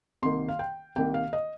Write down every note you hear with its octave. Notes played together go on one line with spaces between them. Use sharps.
C2 C3 D#3 A#3 C6
F5
G5
C2 C3 D#3 A#3 G5
F5
D#5